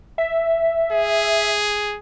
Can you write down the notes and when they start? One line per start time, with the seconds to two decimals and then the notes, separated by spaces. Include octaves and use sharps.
0.18 E5
0.92 G#4